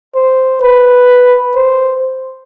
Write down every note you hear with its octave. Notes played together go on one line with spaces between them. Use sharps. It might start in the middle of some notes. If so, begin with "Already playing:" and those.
C5
B4
C5